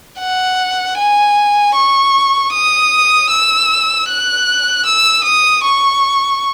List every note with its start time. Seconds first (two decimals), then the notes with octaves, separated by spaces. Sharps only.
0.20 F#5
0.98 G#5
1.75 C#6
2.53 D#6
3.30 E6
4.09 F#6
4.86 E6
5.24 D#6
5.64 C#6